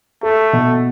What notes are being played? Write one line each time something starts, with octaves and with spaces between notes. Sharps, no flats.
A3 A4
B2